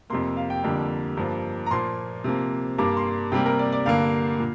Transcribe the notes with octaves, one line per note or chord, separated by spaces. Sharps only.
F2 C3 A#3 C6
F5
G5
F2 D3 G3 A#3
G2 F3 A#3
A#5
A#2 F3 A#3 C6
C3 F3 A#3
G2 G3 A#3 D6
C6
C3 G3 A#3 G5
A#4
D5
D5
G2 D3 A#3 F5
A#2